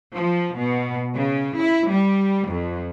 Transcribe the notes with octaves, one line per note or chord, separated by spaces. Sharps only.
F3
B2
C#3
E4
G3
F2